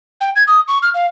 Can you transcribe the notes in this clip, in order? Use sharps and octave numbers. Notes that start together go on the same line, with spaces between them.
G5
G#6
D#6
C#6
F6
F5